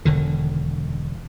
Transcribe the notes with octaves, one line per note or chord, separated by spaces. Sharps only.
E1 D3 D#3